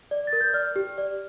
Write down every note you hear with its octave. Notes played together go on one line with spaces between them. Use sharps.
D5
A6
A#4
G6
D5 F6
G4
D5